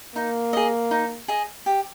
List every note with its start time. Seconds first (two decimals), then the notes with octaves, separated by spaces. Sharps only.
0.15 A#3 D#4
0.53 G#4 D#5
0.91 D#4
1.28 G#4 D#5
1.66 G4